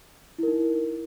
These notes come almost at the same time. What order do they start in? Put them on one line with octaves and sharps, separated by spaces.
E4 A#4 D#4